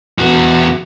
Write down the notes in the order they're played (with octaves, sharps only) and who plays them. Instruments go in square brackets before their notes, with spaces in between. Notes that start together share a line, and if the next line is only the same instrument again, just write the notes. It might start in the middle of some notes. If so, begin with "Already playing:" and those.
[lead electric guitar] E2 F#4